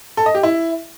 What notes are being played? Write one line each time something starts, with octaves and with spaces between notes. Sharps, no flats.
A4
D#5
G4
E4